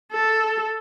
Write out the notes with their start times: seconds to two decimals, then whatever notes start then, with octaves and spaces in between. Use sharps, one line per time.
0.12 A4